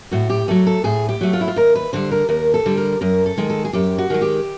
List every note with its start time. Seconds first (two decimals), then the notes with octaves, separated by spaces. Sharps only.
0.11 A2 F#4
0.30 G4
0.48 F#3 A3 A4
0.67 A4
0.84 A2 G#4
1.09 G4
1.21 F#3 A3
1.33 F4
1.41 E4
1.48 F4
1.56 D#2 A#4
1.75 B4
1.93 D3 G3 C5
2.11 A#4
2.29 D#2 A#4
2.54 A4
2.66 D3 G3
2.77 A#4
3.01 F#2 A#4
3.26 A4
3.38 D#3 G#3
3.50 A4
3.65 G#4
3.73 F#2 G4
3.98 F#4
4.10 D#3 G#3 G#4
4.22 G4